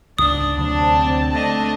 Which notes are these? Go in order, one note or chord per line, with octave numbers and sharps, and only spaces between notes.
C#2 G#2 D4 D#6
D2 C3 F#3 C4 D4 A5
A3 D4 D#5